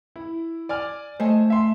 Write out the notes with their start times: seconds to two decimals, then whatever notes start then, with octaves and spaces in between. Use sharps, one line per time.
0.16 E4
0.69 D5 G#5 F6
1.20 A3 C5 D#5 G#5
1.50 E5 C6